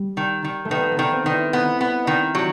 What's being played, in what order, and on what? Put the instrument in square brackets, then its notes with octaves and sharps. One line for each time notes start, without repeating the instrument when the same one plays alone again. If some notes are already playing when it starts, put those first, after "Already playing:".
Already playing: [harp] G3
[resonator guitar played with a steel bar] D#3
D#3
[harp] A3
[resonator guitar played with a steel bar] D#3 [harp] B3
[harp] B3
[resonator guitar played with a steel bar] D#3
[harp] C4
[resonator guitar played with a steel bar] D#3
[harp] E4
[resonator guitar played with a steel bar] B3
B3
D#3
[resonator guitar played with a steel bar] F#3 [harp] G4